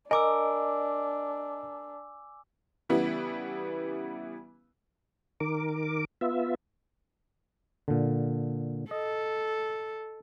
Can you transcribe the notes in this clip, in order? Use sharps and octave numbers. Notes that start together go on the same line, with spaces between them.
D4 A#4 D#5 G#5 D6 E6
C#3 E3 G3 B3 E4
D#3 A#4 D6
B3 F4 E5
A#2 D3
A4 D#5